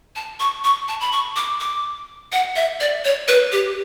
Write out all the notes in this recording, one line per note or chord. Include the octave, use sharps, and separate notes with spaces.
A5
C#6
C#6
A5
B5
C#6
D6
D6
F#5
E5
D5
C#5
B4
G4